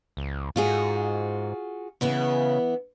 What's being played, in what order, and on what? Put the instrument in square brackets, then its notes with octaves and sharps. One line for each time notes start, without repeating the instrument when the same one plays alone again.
[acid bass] C#2
[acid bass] G#2 [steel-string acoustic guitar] F4 F#4 G#4
[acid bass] C#3 [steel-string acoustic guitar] E3 B3 E4